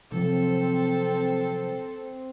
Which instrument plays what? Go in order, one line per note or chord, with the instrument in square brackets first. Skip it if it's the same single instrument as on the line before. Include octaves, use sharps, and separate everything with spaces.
[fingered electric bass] C3 F3 F#3 [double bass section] C4 [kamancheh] A4